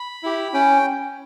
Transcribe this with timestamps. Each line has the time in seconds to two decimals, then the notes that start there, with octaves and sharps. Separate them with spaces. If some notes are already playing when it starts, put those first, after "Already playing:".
Already playing: B5
0.23 E4 G4
0.54 C#4 G5